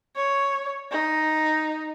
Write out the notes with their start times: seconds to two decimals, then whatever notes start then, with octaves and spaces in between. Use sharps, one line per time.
0.16 C#5
0.91 D#4